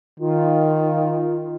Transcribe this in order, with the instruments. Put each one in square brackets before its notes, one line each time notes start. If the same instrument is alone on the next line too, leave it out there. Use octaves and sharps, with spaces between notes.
[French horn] D#3 [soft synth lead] F4